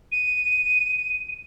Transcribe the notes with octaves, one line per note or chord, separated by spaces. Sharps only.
D#7